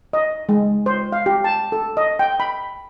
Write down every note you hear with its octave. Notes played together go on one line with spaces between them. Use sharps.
D#5
G#3
C5
F5
G4
A5
A4
D#5
G5
B5